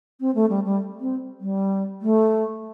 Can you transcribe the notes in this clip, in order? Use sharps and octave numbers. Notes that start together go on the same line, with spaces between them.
C4
A3
G3
G3
C4
G3
A3